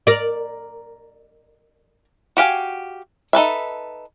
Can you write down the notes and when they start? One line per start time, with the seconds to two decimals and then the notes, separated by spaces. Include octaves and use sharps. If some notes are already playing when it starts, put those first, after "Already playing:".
0.07 A#4 D5
2.37 F#4 G4 F5 G#5
3.33 D#4 A4 B4 E5